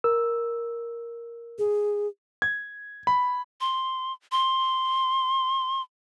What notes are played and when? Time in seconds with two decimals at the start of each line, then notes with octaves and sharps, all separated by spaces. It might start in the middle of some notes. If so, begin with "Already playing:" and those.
0.04 A#4 E6
1.59 G#4
2.42 G#6
3.07 B5
3.61 C6
4.32 C6